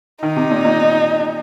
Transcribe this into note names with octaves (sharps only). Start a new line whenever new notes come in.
D#3 D#4
C3
A#2
A#2